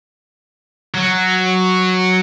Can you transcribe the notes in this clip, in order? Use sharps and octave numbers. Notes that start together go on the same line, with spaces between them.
F#3